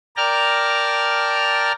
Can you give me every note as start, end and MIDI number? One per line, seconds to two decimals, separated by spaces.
0.17 1.72 70
0.17 1.72 74
0.17 1.72 79
0.17 1.72 81
0.17 1.72 82
0.17 1.72 89